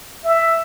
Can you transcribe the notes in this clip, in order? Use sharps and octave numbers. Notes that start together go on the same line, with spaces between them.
E5